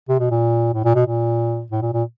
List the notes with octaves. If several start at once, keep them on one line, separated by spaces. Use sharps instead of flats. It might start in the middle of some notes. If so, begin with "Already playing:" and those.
C3
B2
A#2
A2
A#2
B2
A#2
A2
A#2
A#2